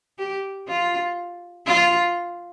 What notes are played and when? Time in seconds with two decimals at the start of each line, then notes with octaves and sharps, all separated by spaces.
0.18 G4
0.68 F4
1.66 F4